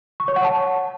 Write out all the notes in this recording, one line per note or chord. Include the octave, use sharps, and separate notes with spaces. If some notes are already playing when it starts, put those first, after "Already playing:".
C#6
C#5
F#5
A5